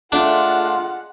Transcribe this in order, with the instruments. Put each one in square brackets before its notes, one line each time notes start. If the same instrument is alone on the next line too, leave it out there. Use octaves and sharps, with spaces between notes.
[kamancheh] G#3 F#5 [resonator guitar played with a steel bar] A3 D5 [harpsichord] D4 [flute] F4